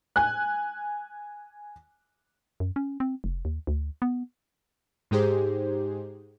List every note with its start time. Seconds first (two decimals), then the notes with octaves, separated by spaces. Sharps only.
0.16 G#5 F#6
2.60 F#2
2.76 C#4
3.00 C4
3.24 F1
3.45 D#2
3.67 D2
4.02 B3
5.11 G#2 G#3 D#4 G4 G#4 C5